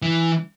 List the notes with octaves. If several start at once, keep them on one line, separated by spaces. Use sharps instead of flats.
E3